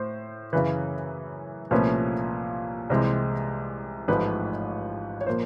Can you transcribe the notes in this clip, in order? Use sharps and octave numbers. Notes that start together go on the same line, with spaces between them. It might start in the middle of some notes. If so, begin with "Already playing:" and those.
Already playing: A2 C5
F#2 C#3 E3 B4
C2 A#2 F3 A3 C#4 B4
C2 C3 E3 G#3 C4
A1 G#2 F3 A3 B4
C#5
A#2 F3 A#3 C5